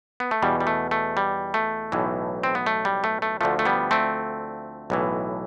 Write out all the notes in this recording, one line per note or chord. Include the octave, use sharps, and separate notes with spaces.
B3
A3
E2 B2 G3
G3
A3
A3
G3
A3
B1 A2 E3
C4
B3
A3
G3
A3
A3
D2 D3 F3 A3
A3
G3 B3
A3 C4
B1 A2 E3